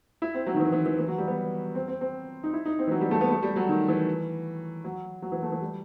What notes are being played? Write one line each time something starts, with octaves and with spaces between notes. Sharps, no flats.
E4
C4
F#3
D#3
E3
E3
E3
E3
F#3
G3
B3
C4
C4
C4
D#4
E4
D#4
C4
E3
F#3
G3
A3
B3
A3
G3
F#3
D#3
E3
F#3
F#3
E3
A3
E3
G3